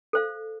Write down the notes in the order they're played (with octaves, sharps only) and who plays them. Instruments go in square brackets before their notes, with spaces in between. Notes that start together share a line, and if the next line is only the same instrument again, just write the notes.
[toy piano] A4 C5 F5